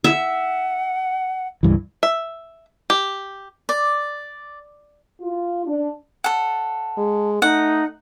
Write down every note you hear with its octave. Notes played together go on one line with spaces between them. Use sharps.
E5 F#5
C#2 G2 E3
E5
G4
D5
F4
D4
A4 F#5
G#3
A3 D#4 F#5